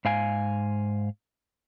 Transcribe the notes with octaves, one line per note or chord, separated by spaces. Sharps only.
G#2 F5 G#5